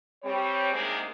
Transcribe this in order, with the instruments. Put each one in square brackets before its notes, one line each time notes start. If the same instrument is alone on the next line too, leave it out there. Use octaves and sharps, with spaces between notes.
[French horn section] G3 C4 C#5
G#2 C3 G#3 A#3 D4 G#4